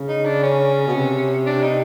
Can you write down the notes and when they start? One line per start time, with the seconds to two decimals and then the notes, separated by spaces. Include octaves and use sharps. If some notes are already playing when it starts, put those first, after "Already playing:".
Already playing: C#3
0.09 D#4
0.25 D4
0.43 C#4
0.87 B2
0.95 C3
1.46 D4
1.63 D#4